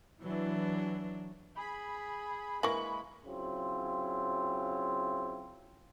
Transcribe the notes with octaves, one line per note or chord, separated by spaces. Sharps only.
E3 F#3 D4
G#4 B5
E3 G#3 A#3 C#6 F#7
C#3 F#3 C4 E4 F4